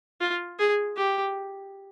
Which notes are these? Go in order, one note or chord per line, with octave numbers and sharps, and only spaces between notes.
F4
G#4
G4